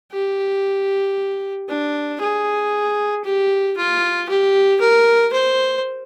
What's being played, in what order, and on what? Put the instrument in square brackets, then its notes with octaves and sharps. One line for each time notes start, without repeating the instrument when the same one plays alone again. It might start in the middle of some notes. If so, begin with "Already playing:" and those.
[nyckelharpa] G4
D4
G#4
G4
F4
G4
A#4
C5